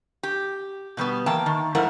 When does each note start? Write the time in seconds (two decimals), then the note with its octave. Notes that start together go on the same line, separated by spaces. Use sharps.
0.23 G4
0.97 B2 G3 A#3 B3
1.26 E3 A#3 G5 A5
1.46 D#3
1.75 G#2 F3 A3 E4 A#4 F#5